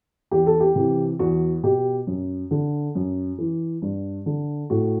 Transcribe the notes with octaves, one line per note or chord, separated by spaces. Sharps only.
E2 G4
A4
G4
C3 E3
E2 F#4
B2 G4
F#2
D3
F#2
E3
G2
D3
A2 F#4